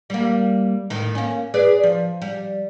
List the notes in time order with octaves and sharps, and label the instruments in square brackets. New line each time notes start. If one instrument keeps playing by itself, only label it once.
[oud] G3 A#3
A2 D#3
A#3 C#4
G#4 B4 D5
F3
G3